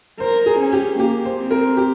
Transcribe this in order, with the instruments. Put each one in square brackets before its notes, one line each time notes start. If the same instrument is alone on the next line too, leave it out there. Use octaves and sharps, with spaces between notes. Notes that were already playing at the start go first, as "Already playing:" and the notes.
[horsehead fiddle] A#4 [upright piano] C5
[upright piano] G#4
[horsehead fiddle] C#4
[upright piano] G4
[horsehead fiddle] A#3 [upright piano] G4
[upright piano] C5
[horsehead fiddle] C4
[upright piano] A#4
G4